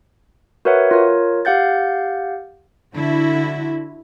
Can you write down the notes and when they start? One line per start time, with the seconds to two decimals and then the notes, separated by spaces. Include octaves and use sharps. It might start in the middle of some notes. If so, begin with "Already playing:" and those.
0.65 F#4 A#4 B4 C#5 E5 F#5
0.91 F4 A#4 C#5
1.45 G4 F5 F#5 G6 A6
2.94 D3 E4 F#4